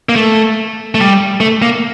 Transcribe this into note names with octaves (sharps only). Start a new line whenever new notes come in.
A#3
A3
A3
G3
A3
A#3